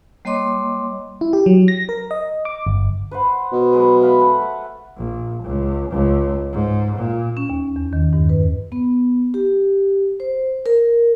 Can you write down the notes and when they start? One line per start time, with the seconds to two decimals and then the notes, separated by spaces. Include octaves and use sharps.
0.25 G3 A#3 C#5 D#5 C6 D6
1.21 E4
1.33 G4
1.46 F#3
1.68 A#6
1.89 A#4
2.11 D#5
2.45 D6
2.67 G1
3.11 B4 C5 F#5
3.52 B2
3.73 F#3 G#3 B4
4.01 E5 F5 B5
4.20 A4 F#5
4.41 A3
4.96 A#1
5.43 C#2
5.90 C#2
6.52 G#2
6.96 A#2
7.37 C#4
7.50 D#2
7.76 E2
7.93 D#3
8.13 G2
8.29 B4
8.72 B3
9.34 G4
10.20 C5
10.66 A#4